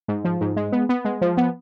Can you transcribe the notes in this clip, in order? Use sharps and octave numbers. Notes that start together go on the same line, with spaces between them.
G#2
F3
G#2
G#3
B3
B3
G#3
F3
B3